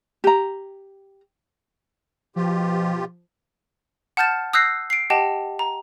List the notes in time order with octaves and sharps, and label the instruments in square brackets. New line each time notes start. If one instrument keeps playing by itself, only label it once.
[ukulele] G4 A#5
[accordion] B2 F4 G4 [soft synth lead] F3
[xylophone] F#5 A5 F6 G6 A6 E7
D#6 E6 F#6 G6 A#6 C7
C7 D7
G4 D#5 F#5 G5 A5
A#5